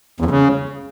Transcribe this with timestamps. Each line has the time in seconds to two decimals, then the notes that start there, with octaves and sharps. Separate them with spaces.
0.20 E2
0.25 F2
0.31 C#3